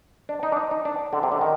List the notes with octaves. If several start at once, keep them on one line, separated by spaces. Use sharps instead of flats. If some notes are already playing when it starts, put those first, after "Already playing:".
D4
D#4
D4
D#4
D#4
D4
D3
C3
D3
D#3